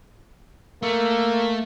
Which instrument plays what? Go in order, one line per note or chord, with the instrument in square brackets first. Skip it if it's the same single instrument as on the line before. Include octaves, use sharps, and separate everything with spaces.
[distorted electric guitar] A3 [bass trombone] A#3